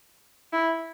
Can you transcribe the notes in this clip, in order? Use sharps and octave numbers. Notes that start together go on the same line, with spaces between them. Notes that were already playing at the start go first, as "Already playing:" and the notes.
E4